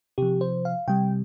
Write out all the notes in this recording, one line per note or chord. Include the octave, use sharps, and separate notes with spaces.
C3 F3 G4
C5
F5
C3 G3 G5